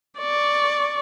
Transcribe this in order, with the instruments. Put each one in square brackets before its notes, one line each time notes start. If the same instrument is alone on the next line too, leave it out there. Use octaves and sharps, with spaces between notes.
[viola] D5 C#6